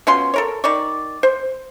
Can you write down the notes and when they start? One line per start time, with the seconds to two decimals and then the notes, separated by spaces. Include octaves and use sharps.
0.07 B2 C#4 F4 C6
0.34 A4 A#4 C#5
0.64 D#3 D5 C#6
1.23 C5